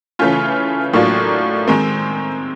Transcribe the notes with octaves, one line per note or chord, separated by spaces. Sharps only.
C#3 E3 A3 C#4 F4
A2 F#3 A#3 D4 F4
D#3 G#3 C4